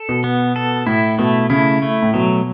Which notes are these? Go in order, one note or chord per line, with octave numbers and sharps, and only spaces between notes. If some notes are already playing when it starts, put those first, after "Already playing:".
Already playing: A4
B2
B3
A4
A2 E4
B2 A3
C#3 E4
A3
A2
B2 F#3